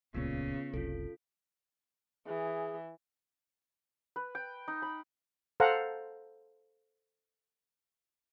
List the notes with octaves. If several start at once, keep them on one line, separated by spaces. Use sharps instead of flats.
D#1 C#2 A#2 C#3 B3 F4
F#1 C2 F4 A4
E3 G#4
B4
G5
D#4
B5
A4 C5 F5 F#5 A#5